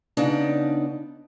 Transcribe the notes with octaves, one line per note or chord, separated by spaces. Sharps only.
C#3 B3 D4 D#4